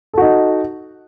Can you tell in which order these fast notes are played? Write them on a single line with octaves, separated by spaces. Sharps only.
A4 F#4 D#4